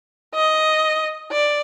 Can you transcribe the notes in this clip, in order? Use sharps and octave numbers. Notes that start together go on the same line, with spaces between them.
D#5
D5